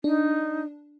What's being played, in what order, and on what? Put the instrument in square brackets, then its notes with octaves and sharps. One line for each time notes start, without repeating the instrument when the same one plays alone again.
[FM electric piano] D4 [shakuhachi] D#4